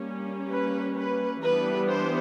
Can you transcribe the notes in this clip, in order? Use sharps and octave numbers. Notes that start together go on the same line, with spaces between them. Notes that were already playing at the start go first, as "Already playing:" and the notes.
Already playing: G3 A#3 C#4
B4
B4
E3 G3 B3 D4 B4
C5